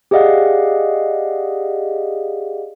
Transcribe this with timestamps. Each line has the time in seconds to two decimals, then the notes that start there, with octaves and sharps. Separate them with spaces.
0.11 G4 G#4 D5 D#5 F5 F#5